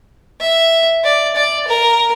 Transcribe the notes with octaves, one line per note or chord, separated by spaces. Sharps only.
E5
D5
D5
A#4